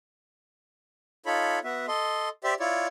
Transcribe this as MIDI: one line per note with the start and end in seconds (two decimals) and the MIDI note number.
1.26 1.59 63
1.26 1.59 65
1.26 1.59 69
1.26 1.59 73
1.26 1.59 83
1.64 1.86 59
1.64 1.86 66
1.64 1.86 76
1.88 2.29 69
1.88 2.29 75
1.88 2.29 84
2.44 2.54 67
2.44 2.54 72
2.44 2.54 74
2.44 2.54 76
2.60 2.87 64
2.60 2.87 65
2.60 2.87 73
2.60 2.87 74